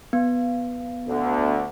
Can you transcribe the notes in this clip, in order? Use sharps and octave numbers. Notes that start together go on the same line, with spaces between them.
B3
D2 D3